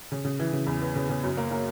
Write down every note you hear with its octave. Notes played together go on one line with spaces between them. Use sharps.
C#3
C#3
E3
C#3
E2
B3
C#3
C#3
F#2
A#3
A#3